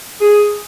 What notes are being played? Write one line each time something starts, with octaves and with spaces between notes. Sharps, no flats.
G#4